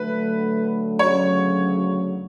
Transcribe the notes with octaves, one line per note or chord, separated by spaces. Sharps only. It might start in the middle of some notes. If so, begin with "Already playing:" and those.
Already playing: D3 F#3 A3 B4
D2 C#3 F#3 C#5